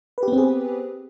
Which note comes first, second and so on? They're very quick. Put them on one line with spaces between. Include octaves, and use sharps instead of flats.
B4 G4 B3 C4 G#4